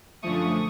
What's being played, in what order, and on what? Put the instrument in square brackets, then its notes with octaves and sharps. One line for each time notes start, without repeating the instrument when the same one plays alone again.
[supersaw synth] F#2 D3 F3 A3 C#6 D#6